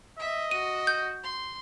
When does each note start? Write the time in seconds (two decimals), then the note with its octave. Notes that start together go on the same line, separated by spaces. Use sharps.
0.19 D#5 E5
0.51 F#4 D#7
0.87 G6
1.23 C6